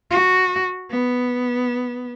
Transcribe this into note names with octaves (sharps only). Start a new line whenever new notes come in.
F#4
B3